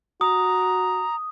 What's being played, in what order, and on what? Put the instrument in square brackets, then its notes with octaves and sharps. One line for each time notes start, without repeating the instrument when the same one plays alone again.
[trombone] F#4 [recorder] A#5 [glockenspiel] D#6